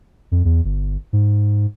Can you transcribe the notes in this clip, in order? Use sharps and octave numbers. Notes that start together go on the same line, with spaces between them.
F2
E2
G1
G#2